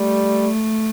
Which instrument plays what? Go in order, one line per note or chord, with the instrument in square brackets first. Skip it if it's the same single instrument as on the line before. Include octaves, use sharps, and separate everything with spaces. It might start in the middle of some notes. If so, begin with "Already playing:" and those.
Already playing: [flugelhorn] G3 [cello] A3